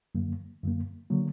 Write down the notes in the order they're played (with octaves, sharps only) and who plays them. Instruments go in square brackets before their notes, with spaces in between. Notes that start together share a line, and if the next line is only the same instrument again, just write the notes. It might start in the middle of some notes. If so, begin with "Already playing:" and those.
[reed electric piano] F#2 D3 F#3 A#3
F#2 D3 F#3 A#3
D3 F#3 A#3